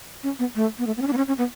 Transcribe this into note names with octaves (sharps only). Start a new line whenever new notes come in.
C#4
B3
A3
B3
A3
B3
C#4
D4
B3
C#4
C#4
B3